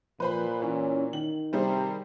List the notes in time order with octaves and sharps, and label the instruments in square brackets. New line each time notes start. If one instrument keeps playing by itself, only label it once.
[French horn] A#2 [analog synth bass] F3 [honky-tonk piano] B4 C5 B5
[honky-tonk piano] E3 [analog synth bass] C#4
[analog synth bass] D#3 [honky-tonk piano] F#7
[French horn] C3 [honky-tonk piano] G3 C4 G#4